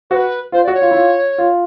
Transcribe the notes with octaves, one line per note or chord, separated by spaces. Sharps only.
F#4 B4 C5
F4 C5
F#4 D5
C#5
F4
E4
F4
F4